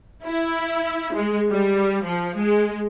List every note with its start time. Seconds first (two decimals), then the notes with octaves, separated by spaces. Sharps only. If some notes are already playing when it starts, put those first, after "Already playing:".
0.24 E4
1.14 G#3
1.49 G3
2.05 F3
2.36 G#3